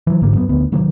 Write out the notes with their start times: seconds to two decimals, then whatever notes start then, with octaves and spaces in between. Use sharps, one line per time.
0.07 E3 F#3
0.22 G#1 G#2 D3 A#3
0.34 F#2 F#3 G#3 B3
0.49 D2 B3
0.72 C3 D#3 F#3 A#3